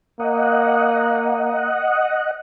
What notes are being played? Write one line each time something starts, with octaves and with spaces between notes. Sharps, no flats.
A#3 D#5 F#5